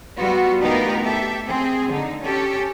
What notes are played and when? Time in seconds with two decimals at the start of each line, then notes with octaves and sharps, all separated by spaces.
0.17 G3 B3 F4 F#4
0.60 D2 B3 D#4 F4 G4 A#4
1.04 G4 A4 E5
1.48 C4 G#4
1.91 D3 D#4
2.24 C#4 G4 A4